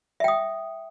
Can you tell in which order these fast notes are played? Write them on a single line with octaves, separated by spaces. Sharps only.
E5 G5 D#6